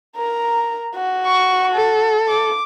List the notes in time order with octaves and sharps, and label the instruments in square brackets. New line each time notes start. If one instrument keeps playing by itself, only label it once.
[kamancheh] A#4 A#5
F#4
[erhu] C#6
A4
[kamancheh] D6